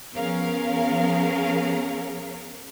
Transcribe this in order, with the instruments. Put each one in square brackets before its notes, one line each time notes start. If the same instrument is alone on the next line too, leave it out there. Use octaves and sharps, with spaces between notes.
[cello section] F3 B3 C#4 G#4 A#4 F5